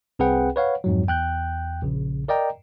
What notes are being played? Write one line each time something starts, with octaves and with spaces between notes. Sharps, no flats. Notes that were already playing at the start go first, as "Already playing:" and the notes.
C2 C4 G#4 B4 F#5 G5
B4 C#5 F5 F#5
F2 G#2 F#3
E2 G5 F#6 G6
A#1 C#3
A#4 D5 D#5 G5 A#5